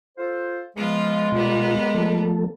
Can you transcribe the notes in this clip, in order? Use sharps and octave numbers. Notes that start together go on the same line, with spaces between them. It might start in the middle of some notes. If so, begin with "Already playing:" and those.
F4 A4 C5
F3 G#3 B3 F4
B2 G3 A#3 B3 F4
F3 A3 A4